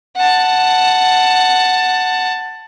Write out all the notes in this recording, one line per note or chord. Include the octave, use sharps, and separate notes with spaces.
F#5 A5